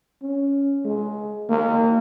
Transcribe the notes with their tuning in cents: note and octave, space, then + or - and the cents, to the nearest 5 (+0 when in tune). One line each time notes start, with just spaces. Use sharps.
C#4 +5
G#3 +15
A#3 -30